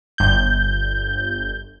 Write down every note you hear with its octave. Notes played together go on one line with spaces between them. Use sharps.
G1 G6